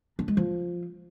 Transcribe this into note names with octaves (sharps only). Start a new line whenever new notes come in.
D4
G#3
F3